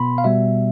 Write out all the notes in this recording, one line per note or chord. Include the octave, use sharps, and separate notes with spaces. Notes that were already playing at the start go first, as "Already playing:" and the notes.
Already playing: B2 B3 B5 C6
F5
B2 G3 B3 E5